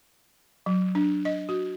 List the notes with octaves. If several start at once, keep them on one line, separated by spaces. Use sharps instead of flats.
F#3
D4
D#5
F#4